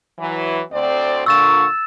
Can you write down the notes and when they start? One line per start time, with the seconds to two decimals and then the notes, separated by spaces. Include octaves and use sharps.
0.18 E3 F#3
0.72 D2 C4 D5
1.26 A#2 D3 C#6 E6 A6 E7